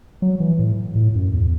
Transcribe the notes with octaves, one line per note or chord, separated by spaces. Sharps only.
F#3
E3
A2
A2
F#2
E2